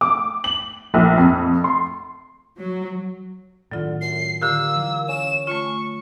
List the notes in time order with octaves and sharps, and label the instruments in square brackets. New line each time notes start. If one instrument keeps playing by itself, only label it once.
[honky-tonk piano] D6
F#7
A#1
F2
C6
[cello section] F#3
[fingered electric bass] A2 D#3 [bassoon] D3 [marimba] F#3 F4
[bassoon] F#2 [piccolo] C7
[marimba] D3 F4 G4 [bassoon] A#3 [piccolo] E6
[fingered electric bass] E3 F#3
[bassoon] C#4 [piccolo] E7
[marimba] A3 F4 [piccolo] C#6